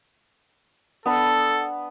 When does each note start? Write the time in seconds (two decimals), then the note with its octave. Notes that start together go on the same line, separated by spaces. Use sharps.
1.06 B3 D4 A4 B5